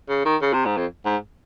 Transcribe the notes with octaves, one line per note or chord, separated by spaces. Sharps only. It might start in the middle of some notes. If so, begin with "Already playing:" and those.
C#3
D#3
C#3
C3
G#2
F2
G#2